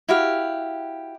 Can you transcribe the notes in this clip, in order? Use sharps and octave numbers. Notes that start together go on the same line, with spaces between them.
E4 F#4 G4 F5